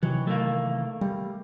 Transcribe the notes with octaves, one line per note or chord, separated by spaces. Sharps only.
C3 D#3 E3 F#3
A3 A#3
G3